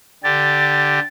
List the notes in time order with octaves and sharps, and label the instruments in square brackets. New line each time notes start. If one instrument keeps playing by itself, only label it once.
[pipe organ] D3 G4 [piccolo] A6